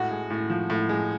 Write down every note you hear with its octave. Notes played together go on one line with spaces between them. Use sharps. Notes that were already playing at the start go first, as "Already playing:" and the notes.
Already playing: A2 F#4
G#3
A2
F3
A2
G#3